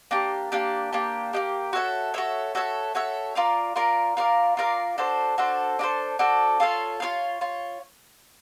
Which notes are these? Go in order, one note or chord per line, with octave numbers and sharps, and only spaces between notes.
A#3 D4 G4
A#3 D4 G4
A#3 D4 G4
A#3 D4 G4
F#4 A4 C#5 E5
F#4 A4 C#5 E5
F#4 A4 C#5 E5
F#4 A4 C#5 E5
F4 A#4 D5 F5
F4 A#4 D5 F5
F4 A#4 D5 F5
F4 A#4 D5 F5
D4 F#4 A4 C5
D4 F#4 A4 C5
D4 F#4 A4 C5
D4 F#4 A4 C5
F4 A4 C#5 F5
F4 A4 C#5 F5
F4 C#5